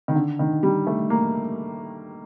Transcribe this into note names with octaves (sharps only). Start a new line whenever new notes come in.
D#3
D3
D#3
G3
A3
A#3